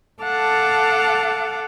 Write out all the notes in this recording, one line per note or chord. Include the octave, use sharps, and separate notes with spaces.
A4 F5 F#5 A5 D6